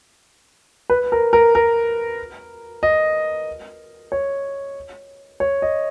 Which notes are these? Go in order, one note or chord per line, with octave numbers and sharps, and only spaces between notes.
B4
A#4
A#4
A#4
D#5
C#5
C#5
D#5